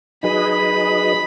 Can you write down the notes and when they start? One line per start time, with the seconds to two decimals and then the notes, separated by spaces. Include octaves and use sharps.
0.23 F#3 D#4 G#4 B4 D#5 B5